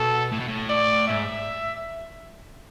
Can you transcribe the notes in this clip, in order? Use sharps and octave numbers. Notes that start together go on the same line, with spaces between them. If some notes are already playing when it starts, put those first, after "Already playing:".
Already playing: B2 A4
A2
B2
A2
D5
G#2 E5